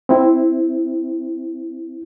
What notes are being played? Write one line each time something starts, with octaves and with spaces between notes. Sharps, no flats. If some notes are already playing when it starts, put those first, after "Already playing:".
C4 E4